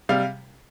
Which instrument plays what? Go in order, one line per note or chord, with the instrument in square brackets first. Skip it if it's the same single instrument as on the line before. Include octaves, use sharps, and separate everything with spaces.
[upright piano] C3 G3 F5